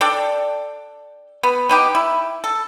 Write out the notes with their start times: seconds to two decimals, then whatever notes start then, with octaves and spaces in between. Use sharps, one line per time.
0.01 D4 A4 D5 G5
1.43 B3
1.69 B3 D#4 G4
1.95 E4
2.44 A4